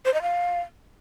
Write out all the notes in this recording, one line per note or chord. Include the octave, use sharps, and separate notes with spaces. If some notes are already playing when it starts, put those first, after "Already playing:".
C5
D#5
F5